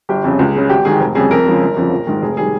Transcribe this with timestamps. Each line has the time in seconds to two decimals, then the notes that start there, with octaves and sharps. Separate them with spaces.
0.09 G1 G4
0.24 F2 C#3
0.39 C#2
0.55 C#3 G#3
0.70 G#1 G4
0.85 G#2 D#3 G#4
1.00 F1
1.15 F2 C#3 G3 G#4
1.30 F2 A#4
1.46 C#3 F3 G#3
1.61 G1
1.76 F2 C#3 F3
1.92 A#1
2.07 G#2 D#3
2.22 F1 G#4
2.37 D#3 G3 G#4